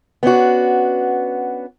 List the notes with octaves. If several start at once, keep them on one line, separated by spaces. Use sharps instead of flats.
B3 C#4 D4 F#4